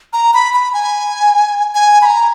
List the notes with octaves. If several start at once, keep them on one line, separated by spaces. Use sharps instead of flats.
A#5
B5
B5
G#5
G#5
B5
A#5